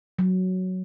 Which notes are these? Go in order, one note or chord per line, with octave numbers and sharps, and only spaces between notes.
F#3